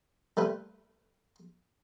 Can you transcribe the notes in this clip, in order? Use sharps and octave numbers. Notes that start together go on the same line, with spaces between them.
G3 A3 B4